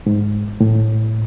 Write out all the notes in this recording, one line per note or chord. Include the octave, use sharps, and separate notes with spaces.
G#2
A2